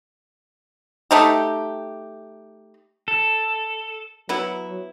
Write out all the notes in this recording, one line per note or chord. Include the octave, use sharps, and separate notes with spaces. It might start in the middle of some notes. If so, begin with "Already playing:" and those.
A3 D#4 G4
A4
F#3 B3 E4